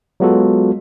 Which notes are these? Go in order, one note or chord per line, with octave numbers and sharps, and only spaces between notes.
F#3 G#3 B3 F4 F#4 A4